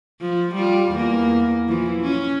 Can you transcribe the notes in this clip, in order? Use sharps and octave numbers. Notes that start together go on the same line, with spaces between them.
F3
G3 F4
E2 A#3
E3 F3
C#4